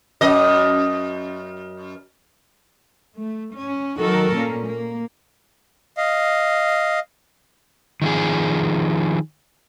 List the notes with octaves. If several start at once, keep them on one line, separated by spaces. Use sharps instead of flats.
F#2 D#5
A3
C#4
D#3 F#3 F#4 A4 A#4
A#2 A#3 C#4
A#3
D#5 F5
D#3 F3 G#4